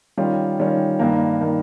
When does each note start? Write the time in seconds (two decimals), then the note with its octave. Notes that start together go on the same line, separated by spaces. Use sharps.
0.17 D#3 G3 C#4 F4
0.59 D#3 G3 C#4 F4
0.99 G2 D#3 A#3
1.41 D#3 A#3